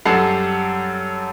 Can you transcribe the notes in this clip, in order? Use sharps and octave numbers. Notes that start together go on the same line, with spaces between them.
F#2 G3 A4 F#5 A5 C7